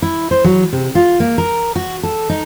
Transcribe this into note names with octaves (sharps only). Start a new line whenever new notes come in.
E4
C5
F#3
C3
F4
A#3
A#4
F#4
A4
D#4